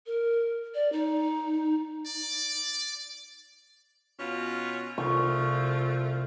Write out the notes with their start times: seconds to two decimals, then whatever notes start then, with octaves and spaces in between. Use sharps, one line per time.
0.06 A#4
0.74 D5
0.92 D#4
2.06 D5
4.18 B2 C#4 F4
4.98 C2 F3 A3 A#3 F4 C#6